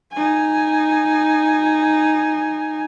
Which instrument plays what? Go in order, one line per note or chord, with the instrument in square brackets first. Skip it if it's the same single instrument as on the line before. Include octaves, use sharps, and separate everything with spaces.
[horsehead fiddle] D#4 G#5